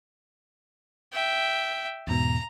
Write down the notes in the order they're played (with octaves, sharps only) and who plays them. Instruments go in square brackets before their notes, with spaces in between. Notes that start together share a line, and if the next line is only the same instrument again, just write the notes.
[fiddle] E5 G5
[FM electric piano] E2 G#2 B2 [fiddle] A#5